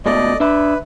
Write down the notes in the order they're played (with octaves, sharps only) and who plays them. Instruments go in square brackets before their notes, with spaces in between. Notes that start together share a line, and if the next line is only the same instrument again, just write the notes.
[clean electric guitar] C#2 B2 A3 [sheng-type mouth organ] D5 D#5
[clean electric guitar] D4 E5 [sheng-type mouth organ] B4